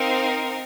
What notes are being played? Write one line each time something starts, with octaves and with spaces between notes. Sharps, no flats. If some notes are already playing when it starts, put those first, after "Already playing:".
Already playing: C4 D#4 A#4 F5